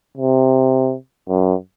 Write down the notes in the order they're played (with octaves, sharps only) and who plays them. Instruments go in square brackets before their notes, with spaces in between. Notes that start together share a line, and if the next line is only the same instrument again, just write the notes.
[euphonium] C3
F#2